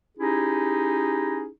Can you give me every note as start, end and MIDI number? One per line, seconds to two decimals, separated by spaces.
0.18 1.48 61
0.18 1.48 63
0.18 1.48 64
0.18 1.48 67
0.18 1.48 68